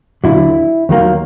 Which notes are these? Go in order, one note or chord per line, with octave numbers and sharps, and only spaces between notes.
D#2 D3 F#3 E4
D#2 D#3 F#3 A#3